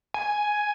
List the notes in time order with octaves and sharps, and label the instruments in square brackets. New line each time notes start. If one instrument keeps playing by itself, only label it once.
[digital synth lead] G#5